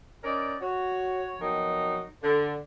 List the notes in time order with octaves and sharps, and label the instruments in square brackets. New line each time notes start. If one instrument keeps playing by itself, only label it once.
[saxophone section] C#4 D#4 A#4 D5
F#4 C#5
F2 B2 F#3 D#4 A#4
D3